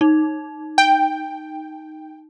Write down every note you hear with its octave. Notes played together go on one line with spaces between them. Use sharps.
D#4
G5